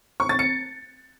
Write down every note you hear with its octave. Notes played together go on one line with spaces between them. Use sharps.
C#6
A6
C#7